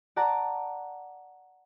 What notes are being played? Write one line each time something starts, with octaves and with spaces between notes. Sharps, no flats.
D5 F#5 A5 A#5 D6